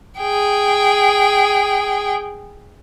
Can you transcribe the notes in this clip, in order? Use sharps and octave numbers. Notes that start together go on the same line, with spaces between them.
G#4 G5